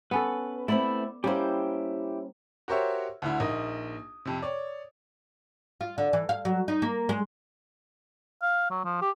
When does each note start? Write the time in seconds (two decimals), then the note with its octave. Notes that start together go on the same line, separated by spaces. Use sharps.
0.11 B3 C#4 A4 B4
0.68 A3 B3 C4 E4 D5 B5
1.24 G3 A#3 C#4 E4 G4 C5
2.68 F#4 G4 A#4 C5 C#5 E5
3.22 D2 D3 E4
3.40 A#1 A#3 D#4 D#5 D#6
4.25 F2 C3
4.42 C#5 D5
5.81 F4
5.98 D3
6.13 E3
6.29 F5
6.45 F#3
6.68 D#4
6.82 A#3
7.09 G#3
8.42 F5
8.70 F#3
8.84 F3
9.02 G4